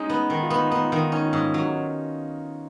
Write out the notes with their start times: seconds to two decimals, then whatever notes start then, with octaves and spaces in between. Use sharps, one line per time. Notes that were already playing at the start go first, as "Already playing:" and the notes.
Already playing: G#3 C#4 D#4
0.10 B3
0.30 D#3 D#4
0.43 F4
0.50 B3
0.56 D#4
0.71 B3 D#4
0.86 F4
0.92 D#3
0.99 D#4
1.12 C#4 D#4
1.26 F4
1.33 G#2
1.40 F4
1.54 F#3 F#4